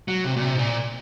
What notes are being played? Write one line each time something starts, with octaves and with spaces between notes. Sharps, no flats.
F#3
C3
A#2
C3
G#2
A#2